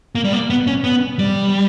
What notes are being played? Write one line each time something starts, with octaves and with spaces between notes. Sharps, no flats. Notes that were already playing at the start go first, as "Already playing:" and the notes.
A#3
G3
A#3
B3
C#4
B3
G3